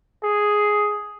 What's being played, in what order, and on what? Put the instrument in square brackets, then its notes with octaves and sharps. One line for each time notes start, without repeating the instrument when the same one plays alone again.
[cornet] G#4